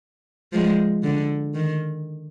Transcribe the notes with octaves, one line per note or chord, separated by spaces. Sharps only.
F3 G#3
D3
D#3